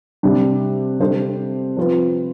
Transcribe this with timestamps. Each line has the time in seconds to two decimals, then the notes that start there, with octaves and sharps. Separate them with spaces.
0.23 C3 G3 D4
1.00 C3 G3 D4 A4 C5
1.77 F3 C4 F4 B4